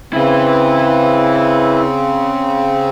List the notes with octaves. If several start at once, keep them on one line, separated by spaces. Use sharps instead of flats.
C#3 C4 E4 B4